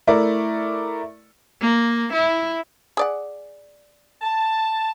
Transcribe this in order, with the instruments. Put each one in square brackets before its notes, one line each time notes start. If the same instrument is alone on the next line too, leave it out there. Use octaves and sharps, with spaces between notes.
[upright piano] A3 E4 A#4 D5
[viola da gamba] A#3
E4
[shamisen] G#4 D5 F#5
[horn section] A5